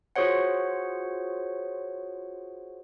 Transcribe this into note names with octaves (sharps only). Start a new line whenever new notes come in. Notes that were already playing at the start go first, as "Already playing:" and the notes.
F4 F#4 G#4 C5 C#5 F#5